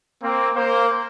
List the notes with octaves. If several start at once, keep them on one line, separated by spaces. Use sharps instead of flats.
A#3 C4
A#3 C5